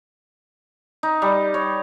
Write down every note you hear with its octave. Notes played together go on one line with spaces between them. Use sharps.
D#4
G3
C#5